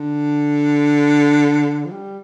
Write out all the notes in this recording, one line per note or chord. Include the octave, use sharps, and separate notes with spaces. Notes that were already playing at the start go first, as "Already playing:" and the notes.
Already playing: D3
F3
G3